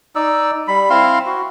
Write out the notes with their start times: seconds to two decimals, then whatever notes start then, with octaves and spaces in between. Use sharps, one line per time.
0.15 D#4 D5 E6
0.68 G3 B5
0.90 C4 E4 F5 C6
1.26 F#4